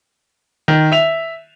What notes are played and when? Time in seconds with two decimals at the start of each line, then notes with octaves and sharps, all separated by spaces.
0.68 D#3
0.92 E5 F7